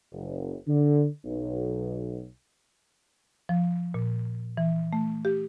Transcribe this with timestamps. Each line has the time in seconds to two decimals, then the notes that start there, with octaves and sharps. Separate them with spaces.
0.13 F#1
0.67 D3
1.25 B1
3.49 F3
3.94 A#2
4.57 E3
4.93 A3
5.25 G4